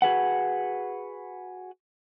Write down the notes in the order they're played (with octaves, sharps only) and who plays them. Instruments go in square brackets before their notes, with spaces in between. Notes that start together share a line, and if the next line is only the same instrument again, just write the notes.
[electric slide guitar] F#4 G#4 B4 F#5